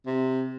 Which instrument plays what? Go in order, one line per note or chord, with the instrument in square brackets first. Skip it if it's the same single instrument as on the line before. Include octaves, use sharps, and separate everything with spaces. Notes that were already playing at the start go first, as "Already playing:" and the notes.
[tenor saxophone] C3